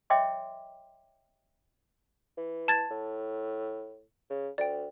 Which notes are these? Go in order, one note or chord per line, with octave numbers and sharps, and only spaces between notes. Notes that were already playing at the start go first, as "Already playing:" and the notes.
C#5 D#5 E5 G5 C6 D6
E3
A5 G#6 A6
A2
C#3
D2 D5 G5